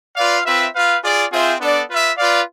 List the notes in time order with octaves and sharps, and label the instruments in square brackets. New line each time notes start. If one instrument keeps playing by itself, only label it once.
[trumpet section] F4 B4 D5 F5
C4 F4 B4 E5
F4 B4 F5
F4 G#4 D5
C4 F4 G#4 C5 E5
B3 D4 A4 D5
F4 B4 E5
F4 B4 D5 F5